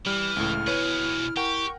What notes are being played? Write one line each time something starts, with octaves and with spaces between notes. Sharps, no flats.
E3 G3 F6
C#2 A2 E4
B2 G#4 B4 C#5
G4 A#4 F#5 G5 C#6